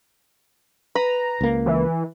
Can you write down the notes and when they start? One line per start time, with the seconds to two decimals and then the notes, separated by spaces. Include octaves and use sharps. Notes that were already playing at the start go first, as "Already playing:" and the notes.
0.95 B4 A#5
1.41 C#2 A#3
1.66 E3